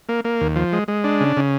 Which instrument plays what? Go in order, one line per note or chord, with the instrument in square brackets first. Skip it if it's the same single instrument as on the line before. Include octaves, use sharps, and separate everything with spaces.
[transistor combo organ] A#3
A#3
D#2
F3
G#3
G#3
D4
C#3
C#3